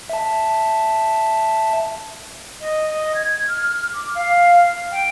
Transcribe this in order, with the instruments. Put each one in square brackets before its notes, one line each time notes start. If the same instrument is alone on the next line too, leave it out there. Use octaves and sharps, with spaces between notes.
[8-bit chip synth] E5 A5
[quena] D#5
D#5
G#6
F6
D6
F5
G5